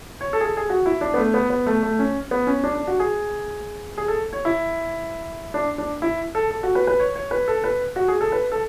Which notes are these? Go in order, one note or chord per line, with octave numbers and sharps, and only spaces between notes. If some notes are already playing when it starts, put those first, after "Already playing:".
C#5
A4
G#4
A4
G#4
F#4
E4
D4
B3
A3
B3
B3
A3
A3
C#4
B3
C#4
D4
D4
F#4
G#4
G#4
A4
C#5
E4
D4
D4
E4
A4
A4
F#4
B4
B4
C#5
C#5
B4
A4
B4
F#4
G#4
A4
B4
A4